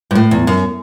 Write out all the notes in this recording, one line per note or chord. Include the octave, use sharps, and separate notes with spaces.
G2
A2
E2
F#2